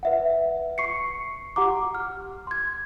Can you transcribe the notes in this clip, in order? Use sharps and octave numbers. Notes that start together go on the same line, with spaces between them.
B4 E5 F#5
C#6 C7 C#7
G4 F#5 A#5 D6
F6
C6 G#6